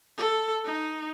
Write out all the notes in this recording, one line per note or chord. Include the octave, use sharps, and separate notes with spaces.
A4
D#4